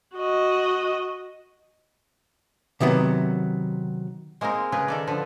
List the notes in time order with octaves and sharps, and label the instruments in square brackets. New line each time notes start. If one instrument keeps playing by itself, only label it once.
[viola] F#4 D#5
[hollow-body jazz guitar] C3 D#3 F#3 B3
[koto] G#3 A#3 C4 D#4 A#4
C#3 G#4 A#4 B4
D#3 A4 D5
D3 F3 A4 B4